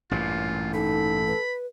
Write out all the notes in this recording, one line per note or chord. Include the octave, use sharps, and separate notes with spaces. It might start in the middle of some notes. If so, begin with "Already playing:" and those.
A1 G2 A#2 F4
D#4 A4 B5
B4